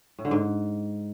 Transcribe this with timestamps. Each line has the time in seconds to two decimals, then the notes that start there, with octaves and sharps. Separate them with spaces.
0.18 A2
0.25 D3
0.31 G#2